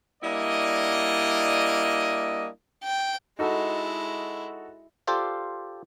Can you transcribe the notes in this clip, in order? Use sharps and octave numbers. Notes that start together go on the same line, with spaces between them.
G3 A#3 D4 E4 D#5
G5
G#3 D#4 E4 F#4 A4
F4 G4 A4 C5 D5 F5